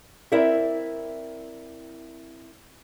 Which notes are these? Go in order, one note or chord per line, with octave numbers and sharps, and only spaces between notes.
C4 E4 A#4 D5 E5